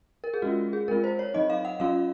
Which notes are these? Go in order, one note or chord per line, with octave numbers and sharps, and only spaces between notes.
A#4
G#4
G#3 C#4 F4 F#4
G#4
G#3 C4 F4 A#4
C5
C#5
F#3 C4 D#4 D#5
F5
F#5
F#3 C#4 F4 F5